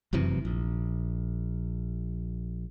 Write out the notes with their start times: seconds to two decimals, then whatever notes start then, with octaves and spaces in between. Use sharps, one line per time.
0.13 F1 F#2 C3 E3
0.45 A#1